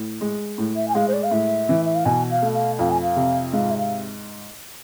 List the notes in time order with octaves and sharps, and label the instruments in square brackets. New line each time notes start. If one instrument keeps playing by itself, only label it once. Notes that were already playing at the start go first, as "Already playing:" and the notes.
Already playing: [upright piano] A2
G#3
A2
[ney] E5
G#5
[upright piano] G#3 [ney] F5
[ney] C5
D5
F5
[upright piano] A2 [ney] E5
[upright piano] E3
[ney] E5
F5
[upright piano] B2 [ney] G#5
[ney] F5
[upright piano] A3
[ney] F5
[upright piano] F2 [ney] F5
[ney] G#5
F5
[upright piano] C3
[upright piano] G#2 [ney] F5
[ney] E5
F5